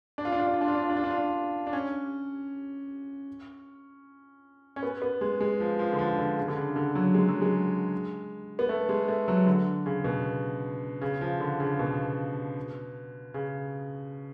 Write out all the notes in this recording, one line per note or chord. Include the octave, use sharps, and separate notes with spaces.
D4
F4
D4
F4
D4
F4
D4
F4
D4
F4
D4
F4
D4
F4
D4
D4
C#4
C#4
B3
B3
G#3
G#3
F3
F3
D3
F3
D3
C#3
D3
C#3
D3
F#3
G#3
F#3
G#3
B3
A3
G#3
A3
F#3
D3
C#3
B2
C#3
F3
D3
C#3
B2
C#3